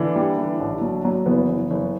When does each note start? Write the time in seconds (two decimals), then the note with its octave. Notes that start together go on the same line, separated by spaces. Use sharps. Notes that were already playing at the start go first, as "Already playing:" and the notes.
Already playing: D3 E3 D4
0.16 G3
0.38 E3
0.60 A1
0.81 F#3
1.05 F#3
1.26 F#1 B3
1.48 F#1
1.70 F#1